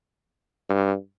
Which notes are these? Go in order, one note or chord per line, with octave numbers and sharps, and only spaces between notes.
G2